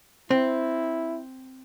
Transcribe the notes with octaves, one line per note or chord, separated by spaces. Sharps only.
C4 E4